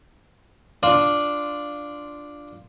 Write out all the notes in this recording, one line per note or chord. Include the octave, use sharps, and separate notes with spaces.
D4 F4 D5 A5